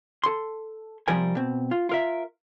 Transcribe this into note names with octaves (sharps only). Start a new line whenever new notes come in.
A4 C6
C3 F3 G3 A#4 G#5
B2 C4
F4
F4 A#4 E5